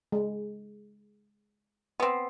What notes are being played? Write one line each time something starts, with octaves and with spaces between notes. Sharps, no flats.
G#3
B3 C4